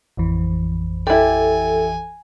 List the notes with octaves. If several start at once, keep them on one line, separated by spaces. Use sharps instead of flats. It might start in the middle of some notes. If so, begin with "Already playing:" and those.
A1 F2 E3
E4 G4 A4 G#5